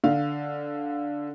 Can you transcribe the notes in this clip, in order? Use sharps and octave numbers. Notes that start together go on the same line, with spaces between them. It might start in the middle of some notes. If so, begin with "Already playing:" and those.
D3 F5